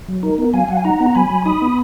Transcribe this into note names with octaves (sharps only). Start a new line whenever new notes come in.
F#3
D#4 A#4
B3
F#3 F5 G#5
F#3 F#5
G#5
D#4 F#5 A#5
B3
A#5
F#3 G#5 B5
F#3
D#4 B5 D#6
B3